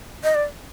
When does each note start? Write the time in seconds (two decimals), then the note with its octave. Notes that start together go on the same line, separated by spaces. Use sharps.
0.24 D#5
0.35 D5